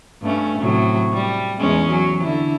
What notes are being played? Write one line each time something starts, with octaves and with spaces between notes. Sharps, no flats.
G2 A3 C#4
A2 C3 F#3
G3
E2 G#3 C#4
F#3
D3 E4